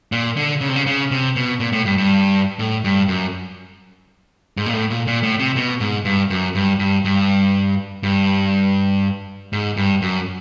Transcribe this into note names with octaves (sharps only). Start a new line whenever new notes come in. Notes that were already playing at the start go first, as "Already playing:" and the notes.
A#2
D3
C#3
C3
C#3
C#3
C3
B2
A#2
A2
G2
G2
A2
G2
F#2
G#2
A#2
A2
A#2
A#2
A2
C3
B2
G#2
G2
F#2
G2
G2
G2
G2
G#2
G2
F#2